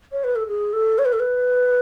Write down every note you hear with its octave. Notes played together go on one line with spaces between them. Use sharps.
C#5
B4
A4
G#4
A4
C#5
B4
A4
B4